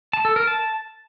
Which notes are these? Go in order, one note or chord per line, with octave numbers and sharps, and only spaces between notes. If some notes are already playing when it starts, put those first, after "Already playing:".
A5
A4
A#4
A5